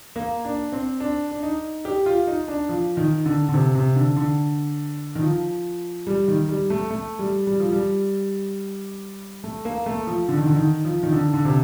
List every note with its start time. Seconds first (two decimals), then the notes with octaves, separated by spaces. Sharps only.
0.16 A#3
0.45 D4
0.72 C4
1.00 D4
1.31 D4
1.43 D#4
1.85 G4
2.06 F4
2.27 D#4
2.48 D4
2.69 F3
2.97 D#3
3.26 D3
3.49 D3
3.54 C3
3.75 C3
3.96 D3
4.16 D3
5.15 D#3
5.22 F3
6.07 G3
6.28 D#3
6.49 G3
6.70 A3
6.90 A3
7.19 G3
7.47 G3
7.60 F3
7.72 G3
9.44 A3
9.65 A#3
9.86 A3
10.07 F3
10.28 D3
10.37 D#3
10.46 D3
10.56 D#3
10.85 F3
11.03 D#3
11.12 D3
11.33 D3
11.45 C3